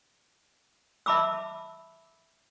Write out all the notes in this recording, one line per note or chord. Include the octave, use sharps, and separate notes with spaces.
E5 A5 B5 D6 E6